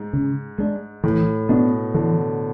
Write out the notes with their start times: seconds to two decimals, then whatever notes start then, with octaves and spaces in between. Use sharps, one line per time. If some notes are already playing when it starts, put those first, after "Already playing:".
Already playing: G#2
0.13 C#3
0.58 G#3 D4
1.04 A2 E3
1.49 B2 B3 D4
1.94 D3 E3